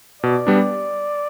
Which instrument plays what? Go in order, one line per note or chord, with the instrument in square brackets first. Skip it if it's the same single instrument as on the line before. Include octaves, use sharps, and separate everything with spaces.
[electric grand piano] B2 [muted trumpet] D5
[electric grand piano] G3 B3 D4